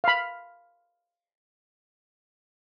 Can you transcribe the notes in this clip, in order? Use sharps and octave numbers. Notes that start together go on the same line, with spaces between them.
F5 B5